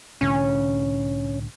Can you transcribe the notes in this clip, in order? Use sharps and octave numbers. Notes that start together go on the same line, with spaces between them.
C2 A2 D3 C#4